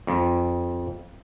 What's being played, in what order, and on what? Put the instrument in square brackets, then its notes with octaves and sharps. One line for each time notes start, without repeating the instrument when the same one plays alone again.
[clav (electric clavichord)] F2